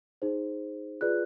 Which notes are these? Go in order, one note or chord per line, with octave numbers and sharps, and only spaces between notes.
D#4 G#4 C5
F4 G#4 B4 D5 F#6